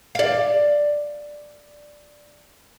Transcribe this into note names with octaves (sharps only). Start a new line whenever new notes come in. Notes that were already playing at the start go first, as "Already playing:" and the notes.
D5 F5